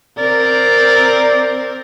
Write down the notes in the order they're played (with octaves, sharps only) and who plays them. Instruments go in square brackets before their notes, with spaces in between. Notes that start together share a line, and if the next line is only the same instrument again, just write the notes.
[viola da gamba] C4 A#4 [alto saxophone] D5